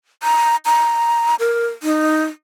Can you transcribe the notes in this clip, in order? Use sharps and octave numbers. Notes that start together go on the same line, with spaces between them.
A#5
A#5
A#4
D#4